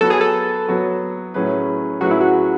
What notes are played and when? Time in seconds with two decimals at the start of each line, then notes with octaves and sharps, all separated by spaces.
0.01 F#3 B3 F#4 A4 B4
0.10 G#4
0.21 A4
0.68 F#3 B3 F#4 B4
1.34 A2 F#3 C#4 G#4 B4
2.01 A2 F#3 C#4 F#4 G#4 B4
2.11 E4
2.21 F#4